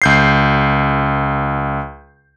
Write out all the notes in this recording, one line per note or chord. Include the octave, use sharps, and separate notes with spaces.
C#2 G6 C7